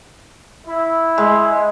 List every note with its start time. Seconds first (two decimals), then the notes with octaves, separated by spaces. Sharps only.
0.67 E4
1.18 G#3